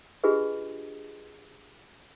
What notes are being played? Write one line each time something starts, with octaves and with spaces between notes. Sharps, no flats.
D4 F4 G4 G#4 B4 D#5